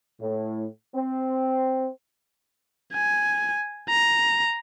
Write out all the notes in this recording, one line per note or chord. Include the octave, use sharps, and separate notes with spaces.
A2
C4
G#5
A#5